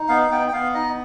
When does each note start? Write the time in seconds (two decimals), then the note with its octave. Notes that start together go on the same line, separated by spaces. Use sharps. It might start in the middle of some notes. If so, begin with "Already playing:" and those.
Already playing: D#4
0.09 B3 F5
0.22 F5
0.30 B3 G5
0.48 G5
0.52 B3 F5
0.74 D#4 D#5